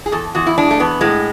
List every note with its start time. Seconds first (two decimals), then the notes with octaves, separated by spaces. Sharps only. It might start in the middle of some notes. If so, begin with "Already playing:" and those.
0.06 G#4
0.12 E2 A4
0.35 E2 F#4
0.47 E4
0.58 G#3 D4
0.71 A3
0.80 E2 B3
1.01 A2 G#3